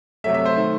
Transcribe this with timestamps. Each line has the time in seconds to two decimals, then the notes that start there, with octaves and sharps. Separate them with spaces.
0.24 C3 F#3 A3 E5
0.34 E5
0.46 C5
0.56 D#3 A3